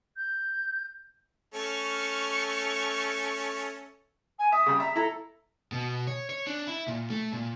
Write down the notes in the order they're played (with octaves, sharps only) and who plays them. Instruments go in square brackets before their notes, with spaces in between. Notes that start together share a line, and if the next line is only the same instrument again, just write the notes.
[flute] G6
[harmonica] A3 C#4 [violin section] C#6 F6
[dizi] G#5
[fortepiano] E5 [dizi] D#6
[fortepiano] C#3 G3
[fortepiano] E5 [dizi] A#5
[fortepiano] E4 A#5 [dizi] A4
[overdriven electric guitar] B2
C#5
C#5
D4
E4
A#2
A3
A#2